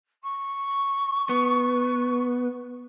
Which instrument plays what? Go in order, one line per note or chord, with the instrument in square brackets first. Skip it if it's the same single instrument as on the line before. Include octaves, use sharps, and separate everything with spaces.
[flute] C#6
[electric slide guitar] B3